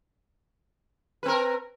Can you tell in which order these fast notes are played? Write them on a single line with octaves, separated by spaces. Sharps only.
B4 C4 A#4